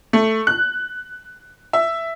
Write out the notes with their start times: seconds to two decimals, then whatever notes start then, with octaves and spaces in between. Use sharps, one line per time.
0.13 A3
0.47 F#6
1.73 E5